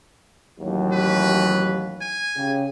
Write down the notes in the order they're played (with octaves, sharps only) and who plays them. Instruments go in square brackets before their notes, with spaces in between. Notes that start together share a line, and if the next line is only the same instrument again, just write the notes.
[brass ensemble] A1 D#2 F#3
[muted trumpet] B4
G#5
[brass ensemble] C#3 G4